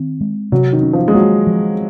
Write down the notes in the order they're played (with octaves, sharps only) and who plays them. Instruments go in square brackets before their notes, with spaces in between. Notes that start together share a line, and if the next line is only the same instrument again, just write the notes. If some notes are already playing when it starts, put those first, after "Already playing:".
Already playing: [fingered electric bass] D#3 C4
G#3
[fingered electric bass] C3 [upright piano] F#3
[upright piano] D#3
[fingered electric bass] C#4
[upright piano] F3
G#3
[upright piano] F#3 [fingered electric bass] A#3
[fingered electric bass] F3